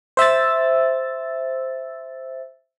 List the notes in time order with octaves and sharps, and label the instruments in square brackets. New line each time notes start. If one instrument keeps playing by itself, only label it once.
[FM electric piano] C5 E5 E6 A6